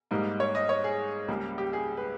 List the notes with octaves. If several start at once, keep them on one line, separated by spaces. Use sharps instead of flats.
G#2 G3 A#3 D#4
C#5
D#5
C#5
G#4
C#2 C#3 G3 A#3
G4
G#4
B4